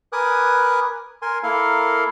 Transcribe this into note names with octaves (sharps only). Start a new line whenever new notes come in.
A#4 B4 G#5 D6 D#6 F#6
A#4 G#5 C6
A#3 E4 A4 A#4 F5